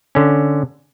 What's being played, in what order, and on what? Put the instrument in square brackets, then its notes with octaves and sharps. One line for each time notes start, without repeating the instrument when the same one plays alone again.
[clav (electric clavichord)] D3 C#4